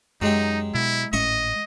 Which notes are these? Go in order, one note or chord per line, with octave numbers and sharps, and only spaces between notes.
F#2 F#3 G#3 D#4 G4
B2 E4
G#1 A2 C#4 D#5 E5 C#6